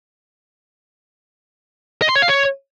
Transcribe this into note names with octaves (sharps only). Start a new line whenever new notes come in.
D#5
C6
C#5
F5
C#5